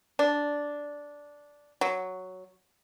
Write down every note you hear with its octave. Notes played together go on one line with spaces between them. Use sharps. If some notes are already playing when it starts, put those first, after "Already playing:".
D4
F#3